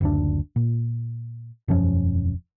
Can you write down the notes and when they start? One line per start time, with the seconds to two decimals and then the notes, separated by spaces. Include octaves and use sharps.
0.01 F#1 D2 D4
0.56 A#2
1.68 E1 F#2 F3 C#4